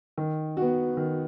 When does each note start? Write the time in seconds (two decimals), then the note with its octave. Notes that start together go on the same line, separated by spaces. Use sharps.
0.18 D#3
0.57 F#4
0.62 B3
0.97 D#3